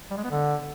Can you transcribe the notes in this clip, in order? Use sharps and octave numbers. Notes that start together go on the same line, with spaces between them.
G3
G#3
B3
D3